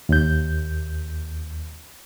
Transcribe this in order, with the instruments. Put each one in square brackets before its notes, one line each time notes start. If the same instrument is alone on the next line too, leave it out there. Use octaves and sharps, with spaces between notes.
[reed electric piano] D#2 G6